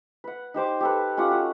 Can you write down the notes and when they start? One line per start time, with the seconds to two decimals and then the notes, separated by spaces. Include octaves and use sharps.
0.24 B4 F#5
0.54 D#4 G4 C5 D6
0.80 G4 A4 B4
1.17 C#4 F4 G4 F#5
1.31 F#4